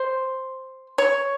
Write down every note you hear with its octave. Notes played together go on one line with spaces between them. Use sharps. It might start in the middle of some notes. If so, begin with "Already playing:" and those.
Already playing: C5
C#5